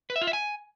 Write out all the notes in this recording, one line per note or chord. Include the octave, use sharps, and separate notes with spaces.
B4
E5
F4
E5
G#5